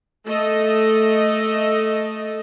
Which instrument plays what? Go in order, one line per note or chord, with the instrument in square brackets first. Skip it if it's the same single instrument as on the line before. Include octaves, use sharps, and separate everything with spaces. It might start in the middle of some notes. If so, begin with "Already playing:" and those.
[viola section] A3 A4 D#5